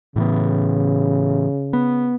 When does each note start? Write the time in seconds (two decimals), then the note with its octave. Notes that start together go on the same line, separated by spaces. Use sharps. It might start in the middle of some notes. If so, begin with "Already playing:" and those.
0.16 A2 C#3 E3 B3
1.73 B3